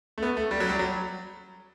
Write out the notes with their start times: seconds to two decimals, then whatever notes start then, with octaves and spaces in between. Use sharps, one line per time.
0.18 A3
0.22 B3
0.37 A3
0.51 G3
0.60 F#3
0.69 G3
0.79 F#3